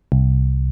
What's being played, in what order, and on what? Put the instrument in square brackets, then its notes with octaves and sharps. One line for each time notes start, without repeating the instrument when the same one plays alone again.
[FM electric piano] C2